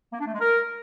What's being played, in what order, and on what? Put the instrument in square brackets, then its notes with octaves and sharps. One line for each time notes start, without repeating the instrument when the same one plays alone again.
[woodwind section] A#3
D4
A3
G#3
A#4